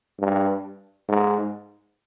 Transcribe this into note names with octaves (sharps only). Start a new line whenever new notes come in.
G2
G#2